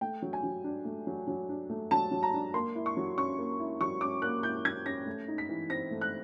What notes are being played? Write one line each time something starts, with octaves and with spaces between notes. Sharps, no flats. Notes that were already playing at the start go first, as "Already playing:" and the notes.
A3 G5
F#3
G#5
F#3
D4
A3
F#3
F#3
D4
A3
F#3 A5
F#3
A#5
D4
A#3 C6
E4
C#6
F#3
C#4 C#6
A#3
E4
F#3 C#6
C#4 D6
A#3 F#6
E4 G6
F#3 G#6
C#4 A#6
A3
D#4
B6
E3
C4 A#6
A3
F#6